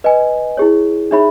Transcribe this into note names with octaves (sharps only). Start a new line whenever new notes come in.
B4 D#5 G#5
E4 G#4 C#5
D#4 G#4 C#5 E5 B5